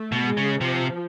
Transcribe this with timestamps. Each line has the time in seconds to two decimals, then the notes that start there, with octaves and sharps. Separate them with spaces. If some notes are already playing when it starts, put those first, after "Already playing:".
Already playing: A3
0.12 B2
0.25 G#3
0.37 C#3
0.61 C3 F3